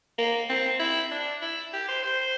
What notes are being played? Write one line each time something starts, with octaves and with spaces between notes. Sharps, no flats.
A#3
C4
E4
D4
E4
G4
C5
C5